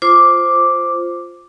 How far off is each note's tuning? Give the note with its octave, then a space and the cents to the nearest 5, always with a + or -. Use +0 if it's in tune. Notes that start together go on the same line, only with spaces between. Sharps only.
F4 +0 C5 +0 D6 +0